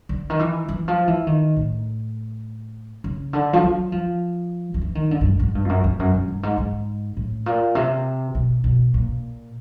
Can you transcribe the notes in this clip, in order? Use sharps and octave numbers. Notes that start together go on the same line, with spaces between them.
D3
D#3
E3
E3
F3
E3
D#3
A2
C#3
D3
F3
F#3
F3
D#3
E3
D#3
D3
G2
G#2
G#2
G2
F2
F#2
F2
F#2
F#2
G2
G#2
G#2
A2
A#2
C3
B2
B2
A#2